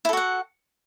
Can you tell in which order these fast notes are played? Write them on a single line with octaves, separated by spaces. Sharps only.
E4 A4 F#4 F#5